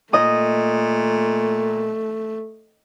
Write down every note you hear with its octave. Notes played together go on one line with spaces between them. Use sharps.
A#2 A3 D#5 D#6